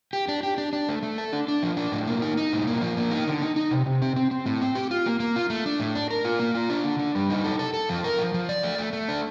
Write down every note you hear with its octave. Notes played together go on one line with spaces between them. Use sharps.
G4
D4
G4
D4
D4
A3
A3
A4
D4
D4
F3
D4
A2
A#3
D#4
D#4
A2
A#3
F3
A#3
D#4
D3
D#4
D#4
C3
C3
C4
C4
C4
A2
C4
G4
F4
A#3
A#3
F4
A3
D4
A2
D4
A#4
F4
A#3
F4
D4
D3
D4
G3
D#4
A4
A4
A4
F3
A#4
F3
F3
D5
A3
A3
A3
D4